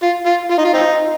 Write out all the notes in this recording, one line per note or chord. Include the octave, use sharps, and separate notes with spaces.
F4
F4
F4
D#4
F4
C4 D#4